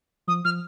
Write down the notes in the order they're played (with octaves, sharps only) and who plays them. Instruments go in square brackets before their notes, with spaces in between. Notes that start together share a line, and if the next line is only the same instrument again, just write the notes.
[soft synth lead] F3 [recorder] D#6
[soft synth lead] F3 [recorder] F6